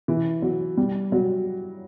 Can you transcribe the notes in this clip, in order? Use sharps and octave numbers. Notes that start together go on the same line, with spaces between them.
E3
F#3
G3
F#3